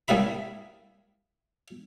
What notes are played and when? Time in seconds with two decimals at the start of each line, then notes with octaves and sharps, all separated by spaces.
0.08 C2 A#3 G#4 E5 B5